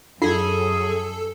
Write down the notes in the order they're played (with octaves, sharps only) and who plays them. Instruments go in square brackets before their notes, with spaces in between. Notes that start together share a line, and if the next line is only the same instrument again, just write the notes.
[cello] F#2 [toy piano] F4 [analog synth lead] G#4 [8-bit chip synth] A4